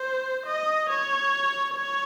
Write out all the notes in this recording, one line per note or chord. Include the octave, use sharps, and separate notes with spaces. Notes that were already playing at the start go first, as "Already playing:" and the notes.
Already playing: C5
D#5
C#5
C#5